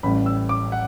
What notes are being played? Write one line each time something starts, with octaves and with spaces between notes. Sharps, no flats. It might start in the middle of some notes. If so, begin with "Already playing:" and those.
A1 A2 G3 B5
E6
D6
F#5